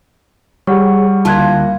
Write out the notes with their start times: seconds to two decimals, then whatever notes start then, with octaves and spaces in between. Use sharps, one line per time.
0.67 G3 G4 G#4 C#5 F#5 C#6
1.25 C#2 D3 A#3 E4 F4 A5 F#6 G#6